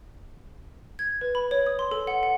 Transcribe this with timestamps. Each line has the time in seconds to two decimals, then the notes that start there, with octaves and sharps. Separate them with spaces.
0.99 G#6
1.21 B4
1.35 B5
1.51 C#5
1.66 D#6
1.79 C6
1.91 A4
2.07 F#5
2.23 F#5